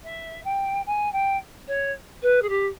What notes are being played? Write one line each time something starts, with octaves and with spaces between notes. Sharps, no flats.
E5
G5
G#5
G5
C#5
B4
G#4
G4